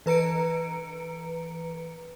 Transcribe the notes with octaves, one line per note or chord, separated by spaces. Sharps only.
E3 B4 A#5 C#7 D7